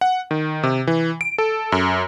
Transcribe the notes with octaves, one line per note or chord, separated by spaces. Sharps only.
F#5
D#3
C3
E3
D7
A4
F#2